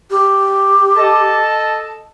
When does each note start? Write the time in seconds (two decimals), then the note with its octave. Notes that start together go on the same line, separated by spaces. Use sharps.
0.11 G4
0.96 A4 D#5 A5